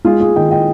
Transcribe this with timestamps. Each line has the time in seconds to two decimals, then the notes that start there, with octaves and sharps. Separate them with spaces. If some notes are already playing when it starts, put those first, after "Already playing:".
0.05 G#3 F4 G#4
0.20 F4 G#4
0.36 D#3 D#5 G5
0.51 D#5 G5